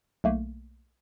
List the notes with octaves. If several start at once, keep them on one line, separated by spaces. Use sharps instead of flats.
B1 A3 A#3